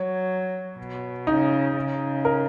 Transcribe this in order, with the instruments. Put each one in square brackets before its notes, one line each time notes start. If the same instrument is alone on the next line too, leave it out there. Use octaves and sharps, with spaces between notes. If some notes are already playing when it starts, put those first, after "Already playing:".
Already playing: [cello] F#3 [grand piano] C#5
[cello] B2
[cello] C#3 [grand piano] D#4
[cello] C#3
[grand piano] A#4